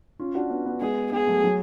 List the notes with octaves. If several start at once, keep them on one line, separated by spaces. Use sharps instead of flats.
C#4 F4
D4 F#4
B3 D4
B3 D4
G#3 B3 G#4
G#3 B3 G#4
F#3 A3
F#3